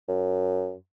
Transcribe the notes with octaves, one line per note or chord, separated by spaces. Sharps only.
F#2